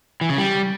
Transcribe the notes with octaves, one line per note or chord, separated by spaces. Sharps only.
E3
C#3
G3